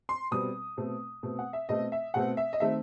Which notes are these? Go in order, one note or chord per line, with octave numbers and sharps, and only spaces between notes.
C6
B2 G3 C4 D#6
B2 A3 C4
B2 A3 C4
F#5
E5
B2 A3 C4 D#5
E5
B2 A3 C4 F#5
E5
D#5
D#3 A3 C4 E5